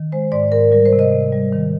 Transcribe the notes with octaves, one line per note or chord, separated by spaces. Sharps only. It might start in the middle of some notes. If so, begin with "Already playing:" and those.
Already playing: D#3
G#3 C5
G#2 D5
G#2 A#4
G3 A#4
C5
C3
D#5
C3
G3
D#3